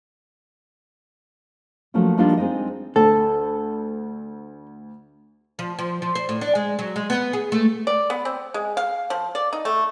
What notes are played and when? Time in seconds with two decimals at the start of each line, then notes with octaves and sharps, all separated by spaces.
1.94 F3 F#3 A3 A#3 C#4
2.17 F3 G3 A#3 D4 D#4 F4
2.37 G#3 C4 D#4 D#5
2.96 D2 A4
5.59 F3
5.79 F3
6.02 F3
6.15 C5
6.29 A2
6.41 D4
6.55 G#3
6.79 F#3
6.96 G#3
7.10 B3
7.33 G#4
7.52 A3
7.87 D5
8.10 B3
8.25 C4
8.54 G#3
8.77 F5
9.10 F3
9.35 D5
9.53 D#4
9.65 A3